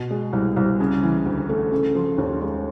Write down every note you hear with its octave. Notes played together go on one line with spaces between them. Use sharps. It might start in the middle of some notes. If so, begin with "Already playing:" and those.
Already playing: B2
G#3
C2
C2
C#3
E3
D2
A3
C#3
F3
D#2
G#3